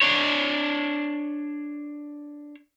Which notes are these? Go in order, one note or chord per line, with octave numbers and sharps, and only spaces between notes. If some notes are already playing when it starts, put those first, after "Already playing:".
D4 C#5